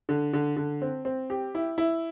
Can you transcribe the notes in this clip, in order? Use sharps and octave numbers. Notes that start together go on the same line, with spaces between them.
D3
D3
D3
C4
C4
G4
E4
E4